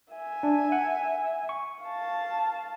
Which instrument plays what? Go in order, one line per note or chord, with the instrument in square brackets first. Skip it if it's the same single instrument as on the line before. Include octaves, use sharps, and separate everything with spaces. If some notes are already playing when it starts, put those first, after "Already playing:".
[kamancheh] E5 G#5
[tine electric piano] D4
F#5
C#6
[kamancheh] F5 A5